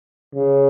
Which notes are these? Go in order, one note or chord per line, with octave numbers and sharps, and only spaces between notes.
C#3